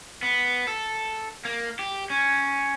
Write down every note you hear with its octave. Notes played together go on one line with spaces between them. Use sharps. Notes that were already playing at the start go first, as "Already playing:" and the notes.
B3
A4
A#3
G4
C#4